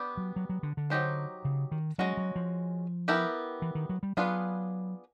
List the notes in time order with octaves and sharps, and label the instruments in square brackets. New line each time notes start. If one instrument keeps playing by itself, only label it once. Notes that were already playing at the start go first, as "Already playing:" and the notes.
Already playing: [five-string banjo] B3 D4 G4
[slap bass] F#3
F#3
F#3
D3
D3
[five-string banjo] F#3 A#3 D#4 G4 C5
[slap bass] C#3
D#3
[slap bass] F#3 [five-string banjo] G#3 C#4 F#4
[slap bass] F#3
F3
[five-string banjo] B3 E4 G4 A#4
[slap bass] E3
D#3
F#3
G3
[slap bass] F#3 [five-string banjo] B3 D4 F4 G#4 B4